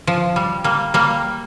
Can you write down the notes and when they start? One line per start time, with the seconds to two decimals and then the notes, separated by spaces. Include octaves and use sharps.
0.07 F3
0.36 G3
0.64 G3 A#3
0.94 G3 A#3